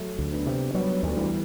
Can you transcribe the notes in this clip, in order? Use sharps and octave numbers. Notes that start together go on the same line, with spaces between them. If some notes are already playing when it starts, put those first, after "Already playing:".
Already playing: F#3 A3
D2
B3 D4
C3
F#3 G3 B3
D2
E3 G3